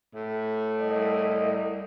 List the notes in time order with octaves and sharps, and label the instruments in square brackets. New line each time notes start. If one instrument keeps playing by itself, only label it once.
[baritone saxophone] A2
[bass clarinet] C2 [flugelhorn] D#5